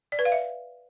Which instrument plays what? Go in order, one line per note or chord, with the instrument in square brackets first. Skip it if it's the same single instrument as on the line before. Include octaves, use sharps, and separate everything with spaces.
[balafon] D5
B4
F5
E5